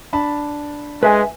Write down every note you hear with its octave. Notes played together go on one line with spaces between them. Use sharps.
D4 A5 B5
G#3 B4 E5 G#5